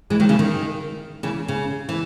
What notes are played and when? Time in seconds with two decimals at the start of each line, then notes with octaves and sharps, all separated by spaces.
0.10 E3 G#3
0.20 D#3 F#3
0.29 C#3 E3
0.39 D#3
1.23 C#3 E3
1.48 C#3
1.89 E3